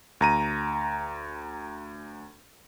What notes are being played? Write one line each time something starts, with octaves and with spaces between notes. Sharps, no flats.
D2 A#5 D#7